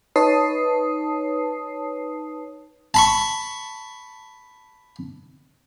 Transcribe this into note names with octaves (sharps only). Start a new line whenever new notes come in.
D#4 B4 C#5 A5 D#6 C7
A5 B5 C#6